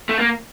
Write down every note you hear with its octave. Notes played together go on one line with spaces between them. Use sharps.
A3
A#3